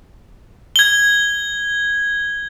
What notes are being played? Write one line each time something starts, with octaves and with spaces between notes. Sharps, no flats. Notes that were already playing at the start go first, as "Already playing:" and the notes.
G#6 G7